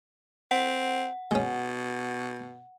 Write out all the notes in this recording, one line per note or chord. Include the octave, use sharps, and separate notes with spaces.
C4 F#5
B2 G#3 C#4